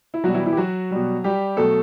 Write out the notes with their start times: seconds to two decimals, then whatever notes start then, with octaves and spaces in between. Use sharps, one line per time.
0.14 E4
0.24 B2 F#3 G3 F#4
0.35 E3 E4
0.46 E3 E4
0.53 G4
0.57 F#3 F#4
0.91 B2 G3
1.24 G3 G4
1.57 B2 F#3 A3 A4